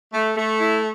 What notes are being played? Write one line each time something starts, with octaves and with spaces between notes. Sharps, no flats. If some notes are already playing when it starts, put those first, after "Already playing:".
A3
A3
E4